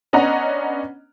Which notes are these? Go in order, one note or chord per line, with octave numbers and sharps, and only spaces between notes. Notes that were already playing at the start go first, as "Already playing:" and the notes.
B3 C#4 D4 D#5 F#5 A#5